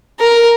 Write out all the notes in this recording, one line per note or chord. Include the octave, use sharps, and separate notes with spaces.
A#4